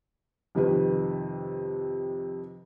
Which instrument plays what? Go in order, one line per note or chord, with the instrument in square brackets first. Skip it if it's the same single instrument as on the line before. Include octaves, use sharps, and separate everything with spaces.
[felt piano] F2 C3 D#3 B4